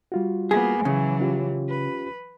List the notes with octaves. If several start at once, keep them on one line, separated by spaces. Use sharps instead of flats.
G3 F4 F#4
A#3 B3 G#4
C#3 E3 F#3 G#5
C#4 F4 G4
B4